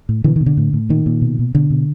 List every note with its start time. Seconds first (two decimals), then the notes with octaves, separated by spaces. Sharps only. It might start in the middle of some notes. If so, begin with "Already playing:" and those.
0.09 A2
0.24 B2 D3 E3
0.36 D#3
0.41 B2
0.46 D3
0.57 A2
0.73 A2
0.89 A#2 D#3
1.06 A#2
1.22 B2
1.39 B2
1.55 B2 D3
1.70 B2